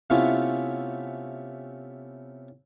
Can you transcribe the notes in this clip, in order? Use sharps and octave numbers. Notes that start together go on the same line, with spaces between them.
C3 A3 B3 C#4 E4 F4